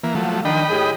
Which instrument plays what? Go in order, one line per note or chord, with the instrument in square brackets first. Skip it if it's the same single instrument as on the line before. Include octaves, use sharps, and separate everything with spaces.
[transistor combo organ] E3 A#3
F3 F#3 A3
[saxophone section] D#3 D4 [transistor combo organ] D#5 G5 B5
[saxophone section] A2 G4 G#4